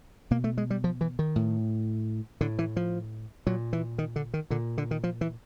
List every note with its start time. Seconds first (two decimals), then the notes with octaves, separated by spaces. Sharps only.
0.31 B2 A#3
0.44 A3
0.58 G#3
0.70 G3
0.84 F3
1.01 E3
1.19 D#3
1.36 A2
2.41 A2 D3
2.59 E3
2.76 F3
3.47 A#2 F#3
3.73 E3
3.98 D#3
4.16 D3
4.34 D#3
4.50 A#2 D3
4.78 D3
4.91 D#3
5.04 F3
5.21 E3